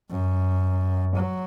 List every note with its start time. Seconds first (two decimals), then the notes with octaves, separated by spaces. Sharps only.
0.10 F#2
1.16 F#3